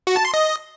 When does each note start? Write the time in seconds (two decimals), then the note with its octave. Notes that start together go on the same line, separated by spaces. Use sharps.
0.07 F#4
0.16 A5
0.25 C6
0.34 D#5